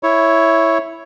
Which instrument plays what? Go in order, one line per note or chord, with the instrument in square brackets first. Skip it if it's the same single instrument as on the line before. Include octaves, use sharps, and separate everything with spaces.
[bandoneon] E4 C#5